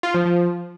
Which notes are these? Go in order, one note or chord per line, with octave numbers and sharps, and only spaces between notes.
F4
F3
F3